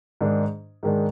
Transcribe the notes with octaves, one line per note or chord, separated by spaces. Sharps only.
G#2 D#3 G#3 D4
G#2 D#3 G#3 D4